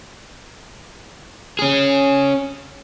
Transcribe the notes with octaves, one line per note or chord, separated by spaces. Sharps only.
C#4 G#4